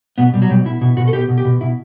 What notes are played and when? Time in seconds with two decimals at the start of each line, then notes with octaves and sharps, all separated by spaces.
0.18 B2 B3
0.34 B2 G3
0.42 F#3
0.49 B2 G3
0.65 B2 E4
0.81 B2 E4
0.97 B2 F#4
1.08 A4
1.13 B2 G4
1.28 B2
1.38 G4
1.45 B2
1.61 B2 E4